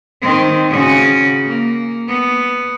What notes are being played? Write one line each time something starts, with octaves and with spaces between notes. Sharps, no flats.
D#3 C4
C#3 F#4
A#3
B3